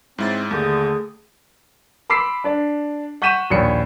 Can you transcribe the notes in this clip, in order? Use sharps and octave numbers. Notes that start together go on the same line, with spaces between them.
G#2 C4 E4 C#5 A6
D#2 D3 A3 G#4 A4 G6
B5 C6 D6 E6 B6 C7
D4 D5
F#5 C#6 G6 B6 D#7 E7
A#1 D#2 C#5 B5 C#7